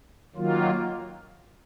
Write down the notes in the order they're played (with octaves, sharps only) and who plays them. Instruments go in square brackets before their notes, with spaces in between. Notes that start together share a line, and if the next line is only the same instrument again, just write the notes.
[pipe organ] D#3 F#3 A#3 F4